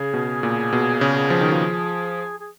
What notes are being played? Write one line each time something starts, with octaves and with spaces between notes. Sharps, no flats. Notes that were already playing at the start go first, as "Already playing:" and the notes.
Already playing: C#3 G#4
B2
A#2
B2
C#3
F3
D#3
F3
G#4